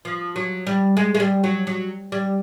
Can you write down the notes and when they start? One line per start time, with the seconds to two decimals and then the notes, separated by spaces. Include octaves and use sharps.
0.05 F3
0.36 F#3
0.67 G3
0.97 G#3
1.15 G#3
1.20 G3
1.44 F#3
1.67 F#3
2.12 G3